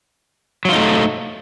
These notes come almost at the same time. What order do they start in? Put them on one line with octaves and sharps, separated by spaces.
F#3 F4 D#4 A3